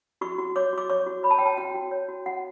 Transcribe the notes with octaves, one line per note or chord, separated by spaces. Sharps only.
F#4 C#6
F#4
C#5 D6
F#4 D6
C#5 C#6
F#4
C#5 B5
A5
C#5 G5
A5
F#4 G5
F#4
C#5
F#4
F#4 F#5